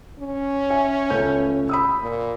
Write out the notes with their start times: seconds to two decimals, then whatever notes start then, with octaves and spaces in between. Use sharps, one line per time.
0.20 C#4
0.70 E5 G#5
1.10 C#2 A3 G6
1.69 B5 D#6 E6
2.01 A#2